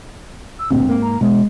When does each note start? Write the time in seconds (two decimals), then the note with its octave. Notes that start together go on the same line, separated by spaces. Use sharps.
0.59 E6
0.71 D2 G2 A#2 C4
0.86 G#2 A#3
1.02 A#5
1.21 B2 G#3